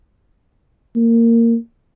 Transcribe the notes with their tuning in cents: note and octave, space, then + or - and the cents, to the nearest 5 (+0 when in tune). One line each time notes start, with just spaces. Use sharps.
A#3 -15